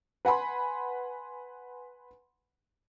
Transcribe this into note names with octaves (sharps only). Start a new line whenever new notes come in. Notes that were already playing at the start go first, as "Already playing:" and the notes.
B4 F#5 G#5 B5 C6